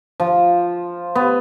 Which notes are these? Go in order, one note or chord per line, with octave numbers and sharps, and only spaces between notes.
F3
B3